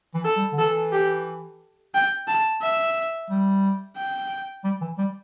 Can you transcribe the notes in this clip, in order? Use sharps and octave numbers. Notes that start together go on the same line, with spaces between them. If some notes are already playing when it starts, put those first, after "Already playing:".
E3
A4
G3
D3
E3 A4
G4
G5
A5
E5
G3
G5
G3
E3
G3